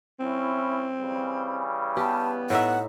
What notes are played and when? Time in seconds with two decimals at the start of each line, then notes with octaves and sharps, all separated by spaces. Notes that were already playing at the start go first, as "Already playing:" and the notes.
0.20 C4 C#4 E4
1.00 C#3 E3 G3
1.97 B3 G4 A5
2.50 A2 D#4 E5 F#5